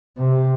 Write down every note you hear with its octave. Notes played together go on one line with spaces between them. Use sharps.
C3